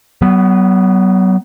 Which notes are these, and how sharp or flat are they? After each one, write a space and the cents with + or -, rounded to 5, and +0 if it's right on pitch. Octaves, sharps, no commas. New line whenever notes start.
F#3 +35 B3 +0